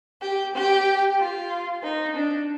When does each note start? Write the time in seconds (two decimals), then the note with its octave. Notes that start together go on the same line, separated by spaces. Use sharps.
0.23 G4
0.55 G4
1.19 F4
1.84 D#4
2.17 D4